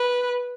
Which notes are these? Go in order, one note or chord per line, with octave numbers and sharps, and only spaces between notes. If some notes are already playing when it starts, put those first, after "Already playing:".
Already playing: B4